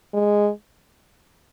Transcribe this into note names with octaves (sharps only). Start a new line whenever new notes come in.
G#3